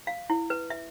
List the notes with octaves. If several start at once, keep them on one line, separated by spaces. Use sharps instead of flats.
F5
E4
B4
E5